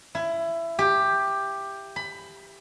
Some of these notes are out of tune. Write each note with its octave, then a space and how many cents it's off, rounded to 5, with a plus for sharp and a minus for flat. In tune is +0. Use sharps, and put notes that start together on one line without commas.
E4 +20
G4 +10
B5 +25